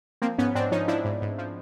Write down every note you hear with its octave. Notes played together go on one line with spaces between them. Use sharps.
F3 A#3 C4
G#2 B3 C#4
G#2 C4 D4
F3 C#4 D#4
F3 D4 E4
G#2
G#2
F3